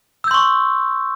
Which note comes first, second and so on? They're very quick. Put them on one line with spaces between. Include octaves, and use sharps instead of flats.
E6 G6 C6 C#6